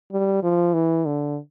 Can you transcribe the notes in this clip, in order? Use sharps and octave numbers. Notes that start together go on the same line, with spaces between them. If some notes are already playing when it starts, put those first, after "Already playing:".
G3
F3
E3
D3